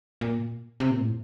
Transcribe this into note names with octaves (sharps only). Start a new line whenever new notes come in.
A#2
C3
A#2
A2